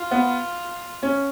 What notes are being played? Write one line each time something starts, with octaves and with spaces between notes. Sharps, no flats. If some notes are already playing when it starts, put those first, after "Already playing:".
Already playing: F4
B3
C#4